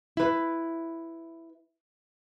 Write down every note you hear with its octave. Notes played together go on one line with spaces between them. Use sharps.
E4 B4